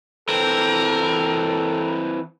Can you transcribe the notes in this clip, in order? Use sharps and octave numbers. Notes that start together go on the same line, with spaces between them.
E3 C4 A4 A#4